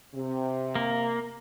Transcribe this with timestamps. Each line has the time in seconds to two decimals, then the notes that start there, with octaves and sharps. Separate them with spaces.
0.14 C3
0.75 A#3